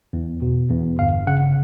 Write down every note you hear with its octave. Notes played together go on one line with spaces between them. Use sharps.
E2
B2
E2
G1 F5
C#3 F#5